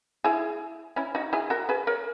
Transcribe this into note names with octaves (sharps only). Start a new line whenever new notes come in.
E4 G#4
C#4 E4
D#4 F#4
E4 G#4
F#4 A#4
G#4 B4
A#4 C#5